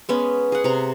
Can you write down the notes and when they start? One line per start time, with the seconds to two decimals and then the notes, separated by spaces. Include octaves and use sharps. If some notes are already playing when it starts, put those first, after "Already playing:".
0.09 G#3 B3 C#4
0.52 G#4 F#5
0.64 C3 A#5